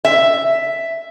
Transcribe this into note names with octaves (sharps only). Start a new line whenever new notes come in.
E5